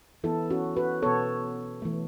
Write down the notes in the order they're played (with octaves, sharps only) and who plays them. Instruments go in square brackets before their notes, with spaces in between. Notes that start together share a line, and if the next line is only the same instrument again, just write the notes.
[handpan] E3 B3 E4 A4
C#4 F#4
F#4 B4
B2 B3 A4 C#5
E3 A3